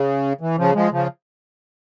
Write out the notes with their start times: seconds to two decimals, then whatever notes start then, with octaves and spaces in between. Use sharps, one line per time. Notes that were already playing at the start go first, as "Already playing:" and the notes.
Already playing: C#3
0.41 E3
0.58 C#3 F3
0.74 F3 G#3
0.92 C#3 F3